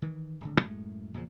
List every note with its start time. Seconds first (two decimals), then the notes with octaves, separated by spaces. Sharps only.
0.02 D#3 E3
0.41 D1 G#1 D3
0.61 F#2 A2 G#3 A3
1.14 E2 A#2 C#3 F3